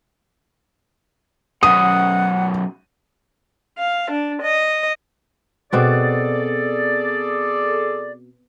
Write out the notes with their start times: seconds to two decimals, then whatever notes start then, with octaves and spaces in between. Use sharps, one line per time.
1.63 F#2 B2 F#5 D#6
3.79 F5
4.11 D4
4.42 D#5
5.73 B2 C4 F#4 G#4 A4 D5